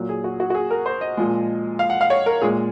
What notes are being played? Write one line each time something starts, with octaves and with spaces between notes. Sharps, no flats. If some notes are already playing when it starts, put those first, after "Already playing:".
Already playing: A#2 F#3
G#4
F#4
F#4
F#4
G#4
A#4
C5
D#5
A#2 F3 G#3
F5
F#5
F5
C#5
A#4
A#2 G#3 G#4